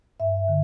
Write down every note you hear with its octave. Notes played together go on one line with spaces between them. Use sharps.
G2 E5
D3